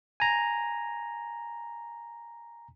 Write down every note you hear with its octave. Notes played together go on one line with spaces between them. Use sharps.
G#5 A#5